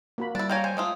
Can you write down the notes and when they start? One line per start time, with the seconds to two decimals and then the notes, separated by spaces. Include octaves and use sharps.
0.18 A#3 F#4 B5
0.35 G3 D4 E4 A6
0.50 A#3 C#5 F5 G5 G#5 A#5
0.64 C5 G#5 G6
0.77 G#3 A3 F4 D#6